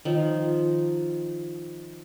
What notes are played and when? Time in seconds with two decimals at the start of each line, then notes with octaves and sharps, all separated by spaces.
0.05 D#3 F3